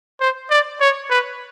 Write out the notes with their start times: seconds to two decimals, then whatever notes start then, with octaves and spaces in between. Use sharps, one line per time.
0.20 C5
0.50 D5
0.80 C#5
1.10 B4